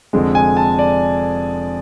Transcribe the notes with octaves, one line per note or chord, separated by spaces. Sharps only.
F1 F2 D3 G#3
G#5
A5
D5